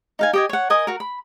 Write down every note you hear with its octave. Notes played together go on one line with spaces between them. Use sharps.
D#4 F5 G#5
G4 D#5 G#5
C#5 F#5
A#4 D#5 G#5 D#6
F#4 A#4
B5